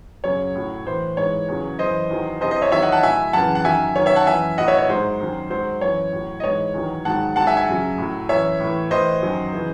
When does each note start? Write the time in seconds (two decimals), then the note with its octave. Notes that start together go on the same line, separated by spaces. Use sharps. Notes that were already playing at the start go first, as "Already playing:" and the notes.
0.24 F#2 C#3 F#3 C#5
0.55 A2 F#3
0.86 A2 E3 C5
1.17 G#2 E3 C#5
1.48 E2 C#3 F#3
1.79 F#2 E3 C5 D#5
2.10 E2 D#3 F#3
2.41 E2 C3 E3 C5 D#5
2.51 C5 D#5
2.62 C#5 E5
2.72 E2 D#3 F#3 C#5 E5
2.82 D#5 F#5
2.92 F#5 A5
3.03 A2 F#3 E5 G#5
3.33 F#2 C#3 E3 F#5 A5
3.55 F#5
3.65 F#2 D#3 F#3 E5 G#5
3.96 F#2 D#3 F#3 C#5
4.06 C#5 E5
4.16 F#5 A5
4.26 F#2 E3 E5 G#5
4.58 A2 F#3 D#5 F#5
4.68 C#5 E5
4.78 C#5
4.89 G#2 F#3 C5
5.20 F#2 D#3 F#3
5.50 G#2 F#3 C5
5.81 F#2 E3 C#5
6.12 A2 F#3
6.40 D#5
6.43 G#2 E3 C#5
6.74 E2 D#3 F#3
7.05 G#2 D#3 F#3 F#5 A5
7.36 G#2 F#3 F#5 A5
7.47 E5 G#5
7.57 E5 G#5
7.68 F#2 C#3 F#3
7.98 A2 F#3
8.29 F#2 E3 C#5 E5
8.60 A2 E3
8.91 A2 E3 C5 D#5
9.23 F#2 D#3 F#3
9.53 C#3 E3